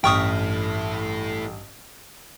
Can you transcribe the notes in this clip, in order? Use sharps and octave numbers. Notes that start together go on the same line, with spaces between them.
A1 G2 A3 E4 G5 C#6 D#6 F6